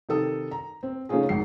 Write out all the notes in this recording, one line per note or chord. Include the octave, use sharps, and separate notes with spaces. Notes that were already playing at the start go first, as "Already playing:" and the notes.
C3 D#3 A4 D#6
A#5
C4
C#3 A3 C#4 D#4 F4 G#4
G#1 G#2 C7